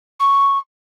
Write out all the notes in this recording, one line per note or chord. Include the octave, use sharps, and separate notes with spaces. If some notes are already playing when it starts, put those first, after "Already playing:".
C#6